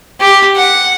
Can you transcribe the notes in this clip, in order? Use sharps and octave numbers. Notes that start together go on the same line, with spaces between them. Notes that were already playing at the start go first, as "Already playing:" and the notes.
G4
F#5